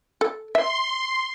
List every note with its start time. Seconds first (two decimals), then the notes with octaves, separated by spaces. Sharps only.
0.21 A4
0.55 E5 C6